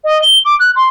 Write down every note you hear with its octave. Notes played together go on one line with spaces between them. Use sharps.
D#5
G7
D6
F#6
C6